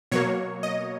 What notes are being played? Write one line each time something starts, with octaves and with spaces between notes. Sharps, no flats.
B2 F#3 A#3 C#5
D#5